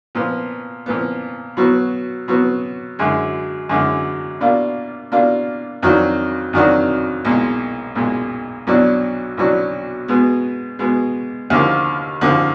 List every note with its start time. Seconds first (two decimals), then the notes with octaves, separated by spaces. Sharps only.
0.15 A#2 F3 B3
0.86 A#2 F3 B3
1.57 B2 F#3 B3
2.28 B2 F#3 B3
2.99 F#2 D3 G#3
3.69 F#2 D3 G#3
4.40 B2 A#3 D4 F4
5.11 B2 A#3 D4 F4
5.82 F2 D#3 F#3 D4 F#4
6.53 F2 D#3 F#3 D4 F#4
7.25 B1 A#2 G#3
7.95 B1 A#2 G#3
8.67 B1 B2 F#3 D4
9.37 B1 B2 F#3 D4
10.08 B2 G#3 B3
10.79 B2 G#3 B3
11.50 D#2 D3 F3 A#3
12.21 D#2 D3 F3 A#3